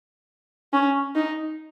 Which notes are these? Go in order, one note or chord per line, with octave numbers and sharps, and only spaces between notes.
C#4
D#4